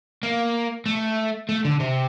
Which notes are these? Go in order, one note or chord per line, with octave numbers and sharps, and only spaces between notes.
A#3
A3
A3
D3
C3